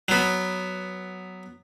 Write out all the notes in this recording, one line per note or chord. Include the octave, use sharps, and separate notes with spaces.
F#3 B3